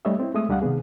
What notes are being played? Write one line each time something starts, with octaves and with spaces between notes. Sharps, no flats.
G3 A3 D4 C#5 D#5 E5
C4 E4
G#3 A3 E5 D#6
C#2 G3 D4 F5 F#5
C3 D#3 B3 G#4